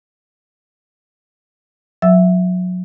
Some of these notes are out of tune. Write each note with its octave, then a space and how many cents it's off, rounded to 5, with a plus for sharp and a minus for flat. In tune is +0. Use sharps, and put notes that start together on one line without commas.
F#3 -30 E5 +0 E6 +0